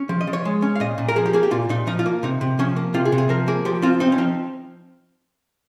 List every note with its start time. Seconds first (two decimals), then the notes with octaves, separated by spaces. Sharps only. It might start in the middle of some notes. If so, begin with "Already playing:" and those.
Already playing: C#4
0.09 F3
0.21 D#5
0.27 F3
0.33 C#5
0.45 G#3
0.62 C#4
0.75 F5
0.80 A#2 D#5
0.98 A#2
1.08 A#4
1.16 F3 G#4
1.26 G4
1.33 A#3 G#4
1.43 G4
1.51 A#2 F4
1.69 A#2 D#4
1.87 F3 D#4
1.99 F4
2.06 A#3
2.23 C3 D#4
2.41 C3
2.59 F3 C#4
2.76 A#3
2.94 C3 F4
3.05 G#4
3.12 C3
3.18 G#4
3.29 F3 A#4
3.48 A#3 G#4
3.65 F3 G4
3.82 C4 F4
4.00 C4 D#4
4.12 C#4
4.18 F3 D#4